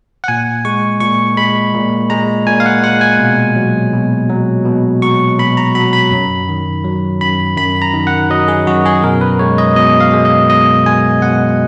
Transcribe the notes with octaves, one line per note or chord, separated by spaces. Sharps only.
F#5
A#2 G#5
G#3 C#6
A#2 C#6
G#3 B5
A#2
G#3 A#5
A#2 G#5
F5
F#5
G#3 F#5
G#5
B2
F#3
B2
F#3
B2
F#3 C#6
B2 B5
A#5
F#3 B5
B5
F#2
D#3
F#3
F#2 B5
F#2 B5
A#5
D#3
F#5
F#3 D#5
G#4
F#2 F#4
G#4
B2 A#4
B4
G#3 C#5
D#5
B2 D#5
F5
G#3
D#5
B2 D#5
G#3 G#5
B2 F#5